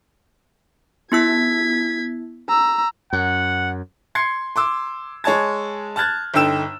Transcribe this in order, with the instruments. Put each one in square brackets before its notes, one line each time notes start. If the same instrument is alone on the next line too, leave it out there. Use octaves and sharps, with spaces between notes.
[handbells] B3 E4 E6 [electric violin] G#6 B6
[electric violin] A#5 E6
[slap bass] F#2 [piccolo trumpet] F#5
[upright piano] C6 G#6 C7 C#7
C6 D6 E6
G#3 C#5 G#5 A5 G#6
A5 F6 F#6 G#6 A6
G1 D3 D#4 G5 E6 E7